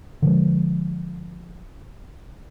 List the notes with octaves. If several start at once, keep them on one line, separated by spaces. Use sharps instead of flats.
D3 F3 G#3